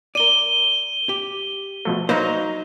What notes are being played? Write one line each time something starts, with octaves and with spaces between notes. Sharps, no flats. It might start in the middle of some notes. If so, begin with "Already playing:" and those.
A#4 D5 D#7 G7
G4
B2 F3 A3
F#3 A#3 D#4 B4 C5